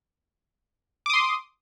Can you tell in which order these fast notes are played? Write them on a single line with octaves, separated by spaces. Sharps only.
D6 D#6 C6